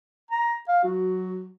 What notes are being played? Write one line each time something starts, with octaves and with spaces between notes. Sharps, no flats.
A#5
F5
F#3 F#4